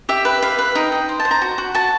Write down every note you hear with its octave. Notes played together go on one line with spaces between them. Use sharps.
G4 E5
B4
B4 F5
B4
D#4 G5
D#4
C5
A5
C5
A#5
F#4
F#4
F#4 A5